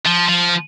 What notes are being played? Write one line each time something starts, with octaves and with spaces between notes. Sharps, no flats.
F3
F3